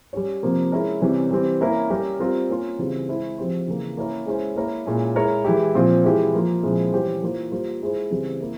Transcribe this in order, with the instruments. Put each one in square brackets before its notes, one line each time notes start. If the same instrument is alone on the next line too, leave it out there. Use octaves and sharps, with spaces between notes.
[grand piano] G3 C#4 G4 C#5
C3 F3 A#3
G#3 C#4 E4 A#4
C3 E3 G3 C#4
E3 G3 C4
A#3 C#4 E4 A#4
G3 C#4 G4 A#4
G3 C4 F4 A#4
A#3 C#4 F4
C#3 E3 G3 C4
G#3 E4 G#4 C5
F3 C4 G4 C5
C#3 E3 A#3
A#3 C#4 E4 A#4 C#5
G#3 C#4 E4 G#4 C5
A#3 E4 A#4 C#5
A#2 G#3 C#4 E4
G#3 E4 A#4 C#5
E3 G#3 E4 G4
A#2 F3 C4 F4
E3 G#3 E4 G4
F3 A#3 F4
A#2 F3 G#3 C4 E4
E3 G3 C#4 G4 C5
E3 A#3 F4 C5
G3 A#3 F4 C5
G#3 E4 G#4 C5
C#3 E3 G3 C4
A#3 E4